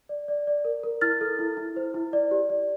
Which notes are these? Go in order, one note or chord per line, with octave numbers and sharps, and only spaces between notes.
D5
D5
D5
A#4
A#4
E4 F6 A6
A4
E4
E4
C5
E4
D5
G4
D5